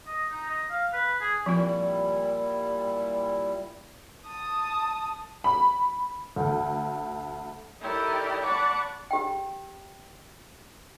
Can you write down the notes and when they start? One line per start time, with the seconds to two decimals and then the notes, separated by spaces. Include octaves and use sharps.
0.07 D#5
0.31 D#4
0.49 D#5
0.71 F5
0.93 B4
1.21 G#4
1.46 A#2 F3 G3 C4 E4 F4
4.26 A5 D#6
5.44 B5
6.36 D2
7.79 D#4 E4 G4 A4 A#4 D5
8.42 D5 F#5 A5 B5 C#6 D6
9.11 G4 G5